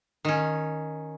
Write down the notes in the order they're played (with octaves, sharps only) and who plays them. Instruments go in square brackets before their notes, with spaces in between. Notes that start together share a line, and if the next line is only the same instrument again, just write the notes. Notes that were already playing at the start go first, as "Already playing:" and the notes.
[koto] D#3 C#4